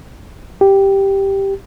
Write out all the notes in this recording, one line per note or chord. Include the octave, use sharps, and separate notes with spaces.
G4